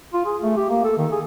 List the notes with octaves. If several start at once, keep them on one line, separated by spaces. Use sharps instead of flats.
F4
G#4
A3
G4
A#3
A4
D#3
G#4